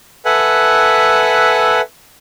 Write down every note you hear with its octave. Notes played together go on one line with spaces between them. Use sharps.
A4 B4 E5 F#5 G#5 F#6